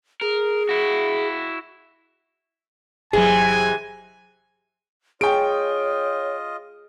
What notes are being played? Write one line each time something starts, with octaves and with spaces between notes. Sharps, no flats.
G#4 A#4
E4 F#4
G1 C3 E3 F#3 G#3 G#4 G#5
F4 G#4 C#5 D#5 G5 C#6 D7